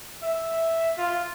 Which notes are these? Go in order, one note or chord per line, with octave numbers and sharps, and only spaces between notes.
E5
F4